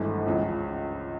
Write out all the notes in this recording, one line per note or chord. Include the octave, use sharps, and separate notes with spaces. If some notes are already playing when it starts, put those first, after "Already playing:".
Already playing: G#1 G2 E3 A3
C#2 C#3 F3